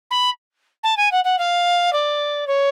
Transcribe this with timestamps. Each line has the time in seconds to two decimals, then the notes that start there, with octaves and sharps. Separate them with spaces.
0.11 B5
0.83 A5
0.97 G#5
1.12 F#5
1.24 F#5
1.39 F5
1.93 D5
2.47 C#5